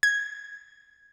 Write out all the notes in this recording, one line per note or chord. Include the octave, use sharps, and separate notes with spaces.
G#6